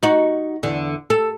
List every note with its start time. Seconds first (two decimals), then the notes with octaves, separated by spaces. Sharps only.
0.03 D#4 F#4
0.63 E2 D3
1.10 A4